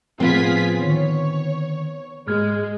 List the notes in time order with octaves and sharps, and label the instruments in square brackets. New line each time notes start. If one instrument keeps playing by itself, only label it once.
[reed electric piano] A2 F3 [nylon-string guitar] B3 C4 [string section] F4 G#4 B6
[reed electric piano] D3 D#3 [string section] C#5
[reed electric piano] G#2 F6 G#6 [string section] G#3